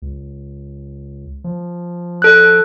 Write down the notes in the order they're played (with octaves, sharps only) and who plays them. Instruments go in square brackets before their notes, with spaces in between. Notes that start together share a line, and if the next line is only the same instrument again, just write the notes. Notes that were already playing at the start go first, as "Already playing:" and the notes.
[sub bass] C#2
F3
[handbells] A4 F#6